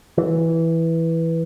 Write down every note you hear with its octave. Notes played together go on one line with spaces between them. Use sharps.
E3